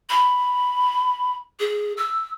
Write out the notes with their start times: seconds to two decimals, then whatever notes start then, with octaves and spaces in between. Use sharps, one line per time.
0.09 B5
1.60 G#4
1.97 E6